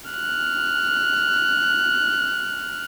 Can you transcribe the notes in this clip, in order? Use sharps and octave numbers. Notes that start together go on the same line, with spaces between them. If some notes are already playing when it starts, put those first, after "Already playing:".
F6 F#6